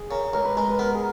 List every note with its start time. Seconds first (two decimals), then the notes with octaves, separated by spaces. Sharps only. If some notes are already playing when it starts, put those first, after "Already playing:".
Already playing: G#4
0.11 C#3 A#4
0.33 C#2 A#4
0.45 B4
0.57 G#3 A#4
0.68 B4
0.79 B3 A#4
0.95 G#4